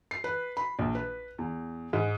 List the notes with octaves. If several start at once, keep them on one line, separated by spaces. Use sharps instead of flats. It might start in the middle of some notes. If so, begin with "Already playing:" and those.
C7
B4
B5
A#1
B4
E2
G#2